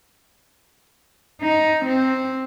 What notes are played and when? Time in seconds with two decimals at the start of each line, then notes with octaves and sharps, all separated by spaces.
1.42 D#4
1.85 C4